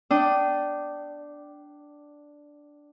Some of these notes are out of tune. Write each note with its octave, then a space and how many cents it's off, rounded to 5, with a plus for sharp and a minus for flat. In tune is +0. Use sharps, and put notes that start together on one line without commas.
D4 +0 G5 -20 D#6 +0